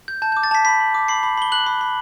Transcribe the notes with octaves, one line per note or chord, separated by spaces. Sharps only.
G6
A5 G6
G6
D6
A6
A5 B6
B5 B6
B5
D6
B5 C7
B5
B5 G7
F#6 F#7
B5
B5